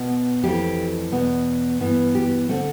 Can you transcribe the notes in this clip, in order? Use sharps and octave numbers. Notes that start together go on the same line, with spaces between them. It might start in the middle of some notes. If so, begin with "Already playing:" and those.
Already playing: B2 B3
F2 E3 A3 G4
E2 B2 B3
G2 E3 B3
G4
D3 A3 C4